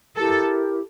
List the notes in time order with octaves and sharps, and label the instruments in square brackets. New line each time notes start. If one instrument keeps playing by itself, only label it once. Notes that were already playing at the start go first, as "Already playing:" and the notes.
[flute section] E4 G4 A#4 [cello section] A4